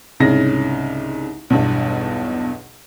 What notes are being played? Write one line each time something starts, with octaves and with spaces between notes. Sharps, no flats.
C2 G#2 C#3 A#6
B1 E2 G2 B2